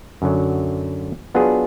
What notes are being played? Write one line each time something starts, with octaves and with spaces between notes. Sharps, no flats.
F#2 D3 F#3
F#3 B3 D4 F4 G#4